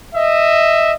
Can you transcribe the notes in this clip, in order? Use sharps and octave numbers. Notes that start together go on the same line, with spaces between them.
D#5 E5